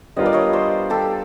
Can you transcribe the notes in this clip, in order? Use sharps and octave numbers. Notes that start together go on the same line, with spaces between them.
G3 B3 D4 F4 A#4 D#5
D5
C#5 D#5
C5 D5
G4 A4